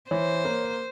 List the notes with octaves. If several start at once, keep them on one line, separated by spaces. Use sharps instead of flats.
E3 C5 C#5
A#3